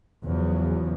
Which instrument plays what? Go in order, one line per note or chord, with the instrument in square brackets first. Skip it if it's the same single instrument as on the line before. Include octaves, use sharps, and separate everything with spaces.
[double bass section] E2 C#3 F3 F#3